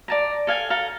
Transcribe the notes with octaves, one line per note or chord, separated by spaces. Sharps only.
D5 A5 A#5
A4 F5 G#5
A4 F5 A#5